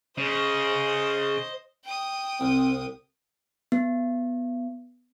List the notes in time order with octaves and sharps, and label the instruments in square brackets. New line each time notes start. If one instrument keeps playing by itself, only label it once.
[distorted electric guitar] C#3 [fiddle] C5 D#5
[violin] G5 D#6
[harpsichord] C2 [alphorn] C4
[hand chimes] B3